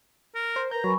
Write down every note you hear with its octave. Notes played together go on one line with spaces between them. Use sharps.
A#4
C5
A#4 B4 A#5 G6
F#3 G#5 B5 C#6